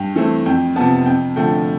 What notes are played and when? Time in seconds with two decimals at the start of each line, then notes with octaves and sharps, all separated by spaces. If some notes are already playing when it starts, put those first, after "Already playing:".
Already playing: G2 G5
0.16 E3 A3 C4
0.46 F2 G5
0.76 C3 F3 B3 A5
1.06 F2 G5
1.36 D3 F3 A3 G5